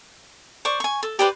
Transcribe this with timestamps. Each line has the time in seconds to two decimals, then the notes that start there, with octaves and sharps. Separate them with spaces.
0.65 C5 D5 C#6
0.80 G#5 C#6
1.03 A4
1.19 G4 B4 C5 D5